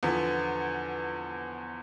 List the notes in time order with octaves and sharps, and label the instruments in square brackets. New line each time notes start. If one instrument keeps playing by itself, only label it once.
[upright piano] E2 D3 F3 B3